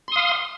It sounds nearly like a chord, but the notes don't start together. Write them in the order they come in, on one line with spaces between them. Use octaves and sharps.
C6 D#6 F5